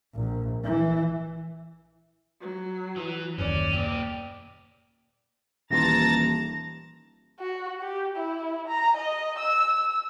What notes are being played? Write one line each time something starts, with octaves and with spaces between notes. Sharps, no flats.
A#1
E3
F#3
E3
F#1 D#2 C#4 D5
A#2 G4
D#1 E3 G4 A5 A#5 C6 A6 A#6
F#4
G4
E4
A#5
D#5
E6